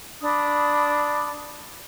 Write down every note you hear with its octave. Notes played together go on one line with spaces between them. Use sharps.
D4 B5 D#6